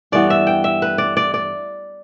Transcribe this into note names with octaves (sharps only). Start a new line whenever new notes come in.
G2 E3 B3 D5
E5
G5
E5
B4
D5
D5
D5